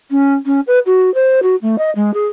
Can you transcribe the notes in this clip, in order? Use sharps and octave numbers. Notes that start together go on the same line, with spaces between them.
C#4
C#4
B4
F#4
C5
F#4
A3
D#5
G#3
G#4